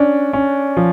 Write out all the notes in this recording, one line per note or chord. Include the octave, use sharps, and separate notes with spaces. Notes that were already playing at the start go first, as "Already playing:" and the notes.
Already playing: C#4 D4
C#4
F3